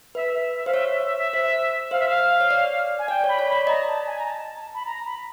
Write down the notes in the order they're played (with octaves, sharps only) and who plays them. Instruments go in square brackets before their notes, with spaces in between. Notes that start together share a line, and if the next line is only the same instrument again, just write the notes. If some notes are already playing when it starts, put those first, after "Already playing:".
[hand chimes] B4 [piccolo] E5
[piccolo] E5
E5
[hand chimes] C5 [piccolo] F5
[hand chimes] C#5 [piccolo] E5
[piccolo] E5
E5
E5
[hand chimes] C5 [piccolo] E5
[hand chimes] C5 [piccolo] F5
[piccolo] E5
F5
[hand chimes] C#5
D5
[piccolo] G#5
[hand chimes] D5 [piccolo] G5
[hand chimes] C#5
[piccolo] B5
[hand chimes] C#5
[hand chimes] D5 [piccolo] B5
[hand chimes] D#5 [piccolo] A#5
[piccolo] A5
G#5
A#5
A5
B5
A#5
B5